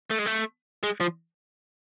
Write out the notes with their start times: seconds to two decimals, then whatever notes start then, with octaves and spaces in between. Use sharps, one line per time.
0.10 A3
0.18 G#3
0.26 A3
0.83 G#3
1.00 F3